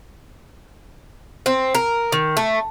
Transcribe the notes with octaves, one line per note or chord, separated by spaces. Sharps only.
C4
A#4
D#3
A3